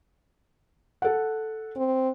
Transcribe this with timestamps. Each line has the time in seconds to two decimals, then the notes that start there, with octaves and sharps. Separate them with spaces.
1.02 A4 F#5
1.76 C4